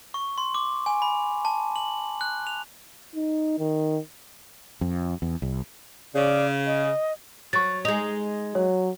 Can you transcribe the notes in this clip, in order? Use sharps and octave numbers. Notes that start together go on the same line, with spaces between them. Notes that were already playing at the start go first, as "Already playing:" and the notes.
C#6
C6
D6
G#5
B5
A5
F#7
F#6
F7
D#4
D#3
F2
E2
C2
C#3 D5
D#5
F#3 C#6 A6
G#3 D#4 F7
F#3 C#5